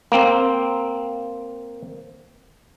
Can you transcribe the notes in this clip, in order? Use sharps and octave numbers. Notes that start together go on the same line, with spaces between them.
A#3 C4